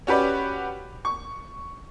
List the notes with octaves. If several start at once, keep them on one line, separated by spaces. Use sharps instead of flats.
C#4 F#4 G4 B4 D5
C#6